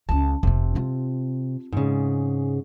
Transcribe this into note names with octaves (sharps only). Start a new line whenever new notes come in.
C#2 C#4 A5
F1 C3 C4
C4 F4
G#2 C#3